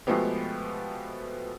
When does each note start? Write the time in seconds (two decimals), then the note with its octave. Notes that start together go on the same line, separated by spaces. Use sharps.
0.07 B2 F3 G#3 A3 B3 G4